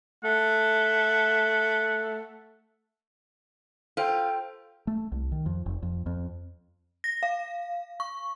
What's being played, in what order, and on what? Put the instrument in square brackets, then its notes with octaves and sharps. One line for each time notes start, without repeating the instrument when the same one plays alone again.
[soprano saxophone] A3 [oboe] F#5
[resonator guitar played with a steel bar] F4 [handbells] A4 C5 G5
[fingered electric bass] A3
C2
D#3
F2
F1
F2
F2
[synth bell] A#6
F5
C#6